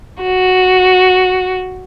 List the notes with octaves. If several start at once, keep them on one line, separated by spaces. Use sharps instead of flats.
F#4